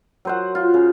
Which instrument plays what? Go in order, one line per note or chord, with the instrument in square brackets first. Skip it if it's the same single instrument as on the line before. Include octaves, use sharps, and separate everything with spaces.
[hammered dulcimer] F#3 C5 F#5
F4
C#3